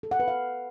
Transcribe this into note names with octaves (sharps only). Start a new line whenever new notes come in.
A4
F#5
B4
F5